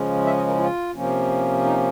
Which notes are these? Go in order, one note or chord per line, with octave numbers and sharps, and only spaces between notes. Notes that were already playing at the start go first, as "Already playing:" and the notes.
Already playing: C#3 F3 G#3 C#4
E5
D#5
A#4
E4
F4
C3 F3 A#3 C#4
D#4